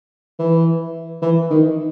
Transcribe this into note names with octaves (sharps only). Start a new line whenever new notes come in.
E3
E3
D#3